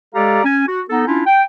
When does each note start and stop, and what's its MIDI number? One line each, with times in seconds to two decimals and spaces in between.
0.15 0.41 56
0.15 0.41 67
0.15 0.41 69
0.15 0.41 74
0.15 0.41 77
0.15 0.41 82
0.45 0.63 61
0.45 0.63 80
0.67 0.81 66
0.90 1.07 59
0.90 1.07 63
0.90 1.07 69
1.07 1.23 61
1.07 1.23 62
1.07 1.23 64
1.07 1.23 65
1.26 1.42 79